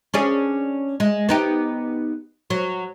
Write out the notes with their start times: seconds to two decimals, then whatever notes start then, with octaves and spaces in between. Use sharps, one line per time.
0.14 C#4 D4 G#4
1.00 G#3
1.29 B3 D#4 G4
2.50 F#3